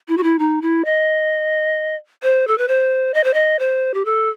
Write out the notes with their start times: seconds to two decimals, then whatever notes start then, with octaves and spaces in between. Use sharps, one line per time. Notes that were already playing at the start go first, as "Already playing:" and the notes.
0.08 E4
0.17 F#4
0.23 E4
0.39 D#4
0.62 E4
0.85 D#5
2.23 C5
2.48 A4
2.58 B4
2.68 C5
3.14 D#5
3.24 C5
3.34 D#5
3.59 C5
3.94 G4
4.05 A4